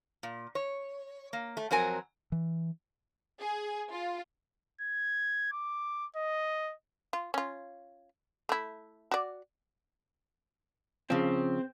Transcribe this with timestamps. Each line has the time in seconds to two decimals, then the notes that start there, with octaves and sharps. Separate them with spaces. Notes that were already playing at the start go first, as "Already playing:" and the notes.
0.23 A#2
0.55 C#5
1.33 A#3
1.57 A3
1.71 F2 F#3 C4 A#4 G#5
2.32 E3
3.39 G#4
3.91 F4
4.81 G#6
5.52 D6
6.16 D#5
7.13 F4
7.34 C#4 F4
8.49 A3 E4
9.11 F#4 D5
11.10 C#3 F3 C4